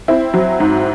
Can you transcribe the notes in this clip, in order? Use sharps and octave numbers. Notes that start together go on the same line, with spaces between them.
C4 E4
F#3
G#2